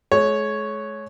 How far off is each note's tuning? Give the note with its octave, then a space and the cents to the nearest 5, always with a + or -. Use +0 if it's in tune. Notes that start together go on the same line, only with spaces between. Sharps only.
G#3 +45 C#5 +0